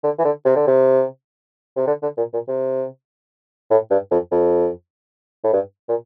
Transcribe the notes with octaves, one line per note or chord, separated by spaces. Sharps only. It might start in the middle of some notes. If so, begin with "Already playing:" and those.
D3
E3
D3
C3
D3
C3
C3
D3
D3
A#2
A#2
C3
A2
G2
F2
F2
A2
G2
A#2